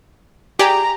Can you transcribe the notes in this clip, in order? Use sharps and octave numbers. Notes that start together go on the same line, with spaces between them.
G4 G#4 D5 A#5